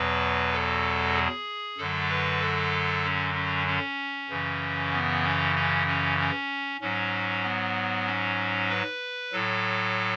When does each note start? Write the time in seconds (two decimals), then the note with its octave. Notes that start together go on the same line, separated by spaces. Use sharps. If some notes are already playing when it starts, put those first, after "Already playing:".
Already playing: E2 B2 F#3 B4
0.53 A4
1.15 G#4
1.78 F#2 D3 F#3 A4
2.09 B4
2.41 A4
3.04 C#4
3.35 C#4
3.67 C#4
4.29 F#2 C#3 E3
4.92 B3
5.24 C#4
5.56 C#4
5.87 C#4
6.19 C#4
6.81 G#2 F#3 C#4
7.44 B3
8.07 C#4
8.69 B4
9.32 A2 F#3 A4